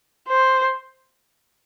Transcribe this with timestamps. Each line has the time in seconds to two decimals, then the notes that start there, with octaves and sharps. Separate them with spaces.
0.28 C5